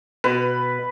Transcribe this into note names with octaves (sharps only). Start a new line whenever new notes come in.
B2 B4